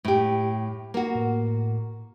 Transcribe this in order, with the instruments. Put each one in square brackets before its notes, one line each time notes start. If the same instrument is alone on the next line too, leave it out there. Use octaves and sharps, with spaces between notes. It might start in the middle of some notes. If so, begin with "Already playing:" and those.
[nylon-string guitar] A2 G4
A#3 F#4
[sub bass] A2